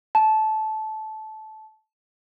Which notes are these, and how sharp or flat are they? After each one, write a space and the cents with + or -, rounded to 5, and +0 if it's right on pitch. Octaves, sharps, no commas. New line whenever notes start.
A5 -15